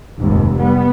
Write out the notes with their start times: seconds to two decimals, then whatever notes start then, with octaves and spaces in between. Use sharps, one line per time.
0.17 F1 D#2 G#2
0.57 G3 B3